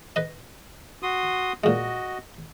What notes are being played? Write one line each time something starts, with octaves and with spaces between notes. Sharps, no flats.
B4 D#5
F#4 C6 D#6
A#2 G#3 F#4 D#5